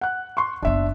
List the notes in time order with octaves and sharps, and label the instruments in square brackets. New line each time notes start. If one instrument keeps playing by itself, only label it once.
[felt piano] F#5 F#6
C6 C#6
[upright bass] F#1 B3 [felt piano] D4 E5